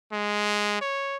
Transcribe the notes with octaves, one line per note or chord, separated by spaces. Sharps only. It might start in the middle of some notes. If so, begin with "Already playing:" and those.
G#3
C#5